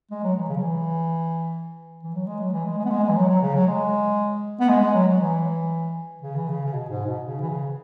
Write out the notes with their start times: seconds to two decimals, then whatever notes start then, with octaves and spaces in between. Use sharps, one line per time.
0.11 G#3
0.23 F#3
0.36 E3
0.49 C#3
0.57 F#3
0.61 E3
2.03 E3
2.14 F#3
2.26 G#3
2.40 F#3
2.53 E3
2.65 G#3
2.78 G#3
2.85 B3
2.90 G#3
3.04 G#3
3.09 E3
3.17 F#3
3.29 F#3
3.42 C#3
3.54 F#3
3.67 G#3
4.60 B3
4.68 G#3
4.81 G#3
4.94 F#3
5.08 F#3
5.21 E3
6.21 C#3
6.36 E3
6.48 C#3
6.65 C#3
6.73 B2
6.89 G#2
7.06 B2
7.24 C#3
7.41 E3
7.49 C#3